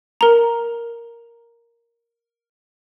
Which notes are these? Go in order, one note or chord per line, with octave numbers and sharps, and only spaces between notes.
A#4 A#5